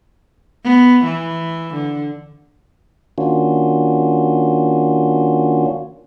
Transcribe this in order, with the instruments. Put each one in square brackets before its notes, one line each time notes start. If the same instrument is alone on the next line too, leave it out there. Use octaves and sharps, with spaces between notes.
[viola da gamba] B3
E3
D3
[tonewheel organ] D#3 A#3 C#4 D4 F4 F#4